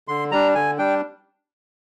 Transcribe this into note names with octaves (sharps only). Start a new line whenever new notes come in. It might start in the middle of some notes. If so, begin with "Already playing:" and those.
D3 C6
G3 D4 A#5
D3 G#5
G3 D4 G5